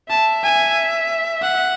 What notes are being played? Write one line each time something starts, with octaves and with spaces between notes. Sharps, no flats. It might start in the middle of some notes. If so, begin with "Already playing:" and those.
E5 A5
G#5
F#5